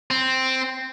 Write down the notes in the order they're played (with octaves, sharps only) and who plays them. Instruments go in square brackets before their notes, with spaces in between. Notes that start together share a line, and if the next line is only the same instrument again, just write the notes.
[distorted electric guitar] C4